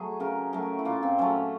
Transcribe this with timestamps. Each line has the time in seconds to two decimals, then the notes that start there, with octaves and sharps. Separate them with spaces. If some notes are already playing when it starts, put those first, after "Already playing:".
Already playing: F#3 A3 G#4
0.20 C#3 A#4
0.53 F#3 A3 A#4
0.79 E4
0.85 A#2 F4
1.03 C4
1.18 F#3 A3 C#4